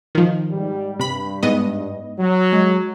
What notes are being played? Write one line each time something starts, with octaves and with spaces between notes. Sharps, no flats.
D#3 F3
G#2 G3
G2 C3 B5
G#2 B3 D#5
F#3
G#3